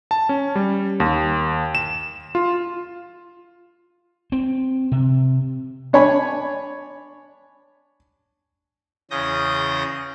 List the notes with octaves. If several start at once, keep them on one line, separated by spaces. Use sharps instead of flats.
A5
C#4
G3
D#2
E7
F4
C4
C3
D4 C#5 G#5 B5
E2 C#3 C#4 D#6 G6 A#6